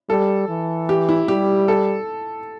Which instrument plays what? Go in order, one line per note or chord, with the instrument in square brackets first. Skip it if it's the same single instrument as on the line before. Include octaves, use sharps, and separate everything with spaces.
[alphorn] G3 [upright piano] A4
[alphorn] E3
[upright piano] G4
E4
[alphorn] G3 [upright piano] G4
[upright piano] A4